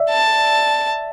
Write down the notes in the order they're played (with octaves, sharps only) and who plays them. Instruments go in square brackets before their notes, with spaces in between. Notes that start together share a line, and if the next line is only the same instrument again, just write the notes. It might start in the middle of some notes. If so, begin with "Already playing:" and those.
Already playing: [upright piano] D5 E5
[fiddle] A5